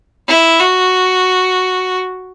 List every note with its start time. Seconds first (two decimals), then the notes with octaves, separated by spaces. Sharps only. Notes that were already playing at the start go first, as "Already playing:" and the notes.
0.28 E4
0.60 F#4